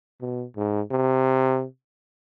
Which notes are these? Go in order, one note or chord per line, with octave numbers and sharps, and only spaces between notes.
B2
G#2
C3